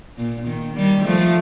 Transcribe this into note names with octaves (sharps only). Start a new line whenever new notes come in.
A#2
D#3
D#3 G3
F3 A3